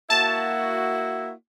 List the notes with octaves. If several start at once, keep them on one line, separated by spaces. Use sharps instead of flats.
A#3 E4 F#4 A5